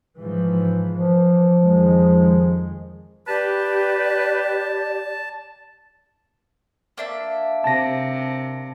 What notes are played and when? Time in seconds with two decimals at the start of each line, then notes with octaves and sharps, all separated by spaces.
0.16 G#2 E3 F3
0.93 E3 F3
1.61 F2 D#3 G#3
3.27 G4 B4 D5 A5
6.98 A#3 D4 E5
7.64 C3 A5 A#6